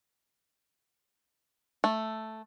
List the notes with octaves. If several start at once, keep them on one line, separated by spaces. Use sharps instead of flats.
A3